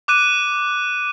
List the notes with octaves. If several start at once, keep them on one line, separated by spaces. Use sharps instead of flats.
D6 F#6 D#7